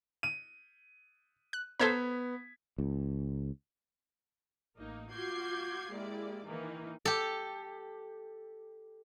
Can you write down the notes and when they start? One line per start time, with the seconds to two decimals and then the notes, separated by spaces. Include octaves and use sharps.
0.23 D#7
1.53 F#6
1.80 B3 A4 C5 A#5 G#6 B6
2.78 C#2
4.77 A1 A#3 D#4
5.12 F4 F#4 D6 G6 G#6 C7
5.92 G#3 A#3 E4 G4 D5
6.47 D#3 E3 A#3 D#4
7.05 G4 A4